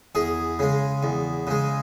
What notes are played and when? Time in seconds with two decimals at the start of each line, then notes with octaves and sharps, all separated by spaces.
0.15 E2 G#4
0.59 C#3 G#3
1.03 E2
1.47 C#3 G#3